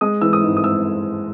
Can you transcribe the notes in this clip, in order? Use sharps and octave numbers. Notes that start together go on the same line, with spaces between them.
G#3 D#6
E3 E6
D#6
G#2
D#6
E6